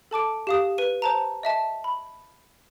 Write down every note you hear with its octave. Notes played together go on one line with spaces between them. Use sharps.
A4 A5 D6 D7
G4 F5 D#6
B4 D#7
C5 A5 A#5
D#5 E5 A5
B5